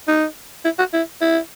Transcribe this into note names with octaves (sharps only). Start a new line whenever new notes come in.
D#4
E4
F#4
E4
E4